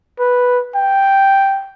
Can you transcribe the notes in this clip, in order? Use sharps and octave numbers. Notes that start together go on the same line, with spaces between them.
B4
G5